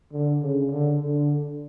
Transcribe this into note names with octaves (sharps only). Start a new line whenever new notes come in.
D3
C#3
D3
D3